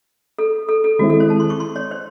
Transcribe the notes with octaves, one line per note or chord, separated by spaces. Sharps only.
A4
A4
A4
D#3 G#3 C4 E4 F#4
A4
C5
A5
C6
C#6
C6
C#5
C5